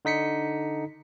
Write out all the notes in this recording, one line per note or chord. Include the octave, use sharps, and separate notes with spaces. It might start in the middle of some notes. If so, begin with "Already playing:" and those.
D3 D#4 B6 C#7